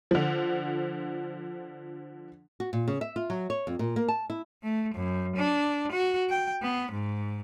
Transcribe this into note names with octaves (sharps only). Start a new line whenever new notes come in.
D3 F3
F#4
A#2
C#3
E5
F4
F#3
C#5
F2
A#2
A#3
A5
E4
A3
F#2
D4
F#4
G5
B3
G#2